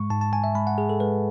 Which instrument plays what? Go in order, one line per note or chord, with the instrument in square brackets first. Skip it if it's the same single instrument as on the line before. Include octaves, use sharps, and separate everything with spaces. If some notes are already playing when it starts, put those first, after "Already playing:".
Already playing: [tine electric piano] G#2 G#3 C#6
G#2 A5
A5
G#2 G#5
E5
G#3 B5
F#5
G#3 G#4
A4
G#3 B4